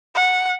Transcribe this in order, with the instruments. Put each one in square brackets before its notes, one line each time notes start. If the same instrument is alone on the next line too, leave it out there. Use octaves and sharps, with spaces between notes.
[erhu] F#5